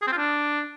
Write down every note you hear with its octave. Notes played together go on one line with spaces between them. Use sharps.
G#4
C4
F4
D4